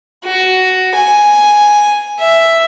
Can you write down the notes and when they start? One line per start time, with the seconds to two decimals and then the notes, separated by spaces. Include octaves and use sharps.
0.24 F#4
0.95 G#5
2.19 E5